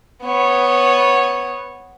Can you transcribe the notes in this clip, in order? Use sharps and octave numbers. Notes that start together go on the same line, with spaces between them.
B3 C#5